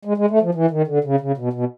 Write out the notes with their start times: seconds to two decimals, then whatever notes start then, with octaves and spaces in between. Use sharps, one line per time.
0.05 G#3
0.17 G#3
0.30 A3
0.42 F3
0.55 E3
0.71 D#3
0.87 D3
1.04 C#3
1.21 C#3
1.37 B2
1.53 B2